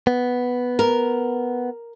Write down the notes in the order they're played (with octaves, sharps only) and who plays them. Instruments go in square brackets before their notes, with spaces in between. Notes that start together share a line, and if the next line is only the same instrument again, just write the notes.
[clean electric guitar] B3
[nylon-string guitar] A#4